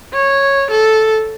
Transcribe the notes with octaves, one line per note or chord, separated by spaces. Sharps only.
C#5
A4